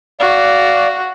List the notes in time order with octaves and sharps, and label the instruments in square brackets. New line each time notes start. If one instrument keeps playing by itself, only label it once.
[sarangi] F#4 [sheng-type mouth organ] D5 F5